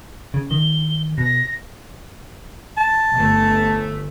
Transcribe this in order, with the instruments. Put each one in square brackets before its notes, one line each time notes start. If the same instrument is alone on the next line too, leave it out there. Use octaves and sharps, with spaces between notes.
[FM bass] C#3
[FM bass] D#3 [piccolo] G7
[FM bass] B2 [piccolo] A#6
[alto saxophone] A5
[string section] G1 A3